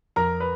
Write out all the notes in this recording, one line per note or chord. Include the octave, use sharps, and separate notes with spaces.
F2 A#4 A#5
B4